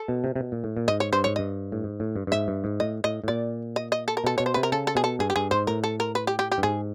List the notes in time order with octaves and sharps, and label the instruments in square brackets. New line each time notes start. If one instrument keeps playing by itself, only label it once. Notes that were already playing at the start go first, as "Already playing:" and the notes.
Already playing: [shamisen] A4
[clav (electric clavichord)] B2
C3
C3
B2
A#2
A2
A#2
[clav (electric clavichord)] G#2 [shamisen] D#5
[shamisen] C#5
[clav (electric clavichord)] G2 [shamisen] C5
[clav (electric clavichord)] G#2 [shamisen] C#5
[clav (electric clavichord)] G2 [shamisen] D#5
[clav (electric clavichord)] A2
G#2
A2
G2
G2
[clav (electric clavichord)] G#2 [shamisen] E5
[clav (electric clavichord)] G2
G#2
[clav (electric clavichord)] A2 [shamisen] D#5
[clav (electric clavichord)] A2 [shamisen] D#5
[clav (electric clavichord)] A2
[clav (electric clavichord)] A#2 [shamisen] D5
[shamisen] D#5
D#5
A4
A#4
[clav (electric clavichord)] B2 [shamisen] A4
[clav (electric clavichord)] B2 [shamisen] C#5
[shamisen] C5
[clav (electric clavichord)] C3 [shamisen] B4
[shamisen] A#4
[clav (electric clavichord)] C#3 [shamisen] A4
[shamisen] A4
[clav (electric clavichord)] B2 [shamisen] G#4
[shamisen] A4
[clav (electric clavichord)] G2 [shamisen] G#4
[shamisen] G4
[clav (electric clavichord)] G2 [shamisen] G#4
[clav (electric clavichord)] G#2 [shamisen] C5
[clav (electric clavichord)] A2 [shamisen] A#4
[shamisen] A4
A#4
B4
G4
G4
G4
[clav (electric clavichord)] G2
[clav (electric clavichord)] G#2 [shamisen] G#4